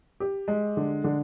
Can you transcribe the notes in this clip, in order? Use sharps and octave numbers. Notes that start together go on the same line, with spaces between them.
G4
G#3
D3
D3